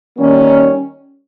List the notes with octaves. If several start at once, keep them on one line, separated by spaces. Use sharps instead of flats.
D#3 G3 A#3 C#4